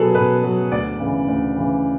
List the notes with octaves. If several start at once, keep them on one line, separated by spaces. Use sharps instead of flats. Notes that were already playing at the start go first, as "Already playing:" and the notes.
Already playing: B2 F#3 B3 G#4 A4
B2 B4
F#3 B3
D2 D5
C#3 E3
D2
C#3 E3